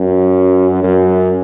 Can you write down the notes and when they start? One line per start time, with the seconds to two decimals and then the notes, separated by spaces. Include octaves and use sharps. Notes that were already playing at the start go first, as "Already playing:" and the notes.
Already playing: F#2
0.83 F#2